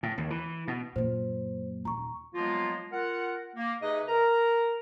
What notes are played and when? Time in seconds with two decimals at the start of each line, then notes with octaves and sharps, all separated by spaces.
0.03 A2
0.18 D#2
0.30 E3
0.68 B2
0.96 F#2 A#2 C5
1.85 D#1 A#5 C#6
2.34 F3 F#3 G#3 A#3 B3 F4
2.92 F4 A#4 F#5
3.56 A#3
3.82 C3 D#4 G#4 B4 D#5
4.08 A#4 A#5